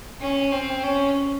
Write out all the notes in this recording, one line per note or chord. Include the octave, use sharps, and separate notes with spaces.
C#4
C4
C#4